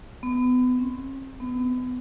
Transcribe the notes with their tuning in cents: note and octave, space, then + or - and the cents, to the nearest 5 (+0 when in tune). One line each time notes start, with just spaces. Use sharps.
B3 +30
C4 +45
B3 +30